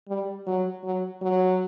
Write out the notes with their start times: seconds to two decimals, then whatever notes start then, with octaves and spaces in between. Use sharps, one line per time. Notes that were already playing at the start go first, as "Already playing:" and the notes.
0.08 G3
0.47 F#3
0.84 F#3
1.22 F#3